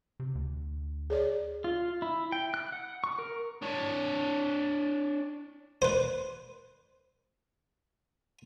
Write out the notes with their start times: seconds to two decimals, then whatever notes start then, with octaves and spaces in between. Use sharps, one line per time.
0.20 C3
0.35 D2
1.10 G#4 C#5 D5
1.64 F4
2.02 E4
2.32 G5
2.54 F#6
2.72 F#5
3.04 C#6
3.19 A#4
3.62 D4 C#5
5.82 B4 C5